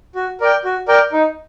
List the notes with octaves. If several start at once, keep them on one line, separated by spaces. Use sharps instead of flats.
F#4
A#4 D5 G5
F#4
A#4 D5 G5
D#4